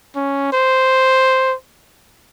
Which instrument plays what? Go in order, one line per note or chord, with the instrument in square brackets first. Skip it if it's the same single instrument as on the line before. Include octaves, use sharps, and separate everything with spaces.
[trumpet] C#4
C5